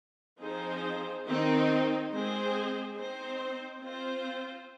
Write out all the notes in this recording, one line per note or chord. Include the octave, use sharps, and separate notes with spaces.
F3 C4 D#4 G#4 C5
D#3 C4 D#4
G#3 C4 G#4 C5
C4 D#4 C5
C4 F4 C5